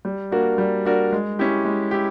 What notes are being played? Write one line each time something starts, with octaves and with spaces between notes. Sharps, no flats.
G3
A#3 D4 F#4 A#4
G3
A#3 D4 F#4 A#4
G#3
C#4 E4 G4
G#3
E4 G4